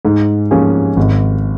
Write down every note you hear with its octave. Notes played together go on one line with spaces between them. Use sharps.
G#2
F3 A#3 C#4 G#4
G#1